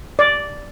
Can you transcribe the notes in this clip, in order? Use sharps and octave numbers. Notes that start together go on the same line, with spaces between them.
D5